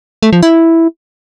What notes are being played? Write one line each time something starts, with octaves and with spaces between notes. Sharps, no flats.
A3
F3
E4